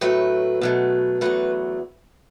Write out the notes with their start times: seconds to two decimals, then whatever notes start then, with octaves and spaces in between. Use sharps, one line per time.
0.01 A2 F#3 A3 B4
0.61 B2 F#3 A3
1.21 E2 D3 F#3 A3 B4